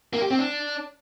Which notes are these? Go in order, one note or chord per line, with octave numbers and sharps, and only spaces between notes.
A#3
G4
C4
D4